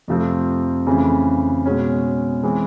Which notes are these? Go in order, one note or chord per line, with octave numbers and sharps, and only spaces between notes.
F2 C3 F3 A3 C4
F2 C#3 E3 A3
B2 G#3 C#4
E3 G#3 C4